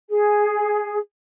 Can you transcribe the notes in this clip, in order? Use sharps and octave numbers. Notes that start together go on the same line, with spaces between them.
G#4